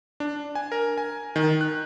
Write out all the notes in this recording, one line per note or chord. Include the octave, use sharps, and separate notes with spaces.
D4
G#5
A#4
G#5
D#3
F#6